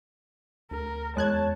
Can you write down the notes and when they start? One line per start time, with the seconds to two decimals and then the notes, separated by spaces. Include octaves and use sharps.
0.71 D2 A#4
1.17 E2 G#3 C#5 A5 F#6 G#6